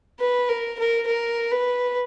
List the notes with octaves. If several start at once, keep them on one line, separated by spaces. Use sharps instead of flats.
B4
A#4
A#4
A#4
B4